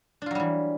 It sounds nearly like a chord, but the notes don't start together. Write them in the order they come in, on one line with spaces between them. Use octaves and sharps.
D4 F4 F#3 G3 E3